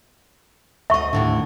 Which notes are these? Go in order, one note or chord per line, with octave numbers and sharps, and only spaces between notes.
D2 D#5 E5 C#6
D#2 A2 D3